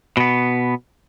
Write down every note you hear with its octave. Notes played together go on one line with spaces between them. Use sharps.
B2 B3